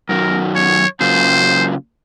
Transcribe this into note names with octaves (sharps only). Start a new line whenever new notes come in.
F#2 D#3 F#3 A#4
C#5
C#3 F#3 A#3 F4 C5